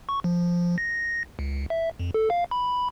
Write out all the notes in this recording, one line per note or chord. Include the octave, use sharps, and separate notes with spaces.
C#6
F3
A#6
C#2
E5
F2
A4
F5
B5